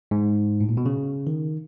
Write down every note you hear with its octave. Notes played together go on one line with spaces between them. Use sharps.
G#2
A2
A#2
B2
C#3
D#3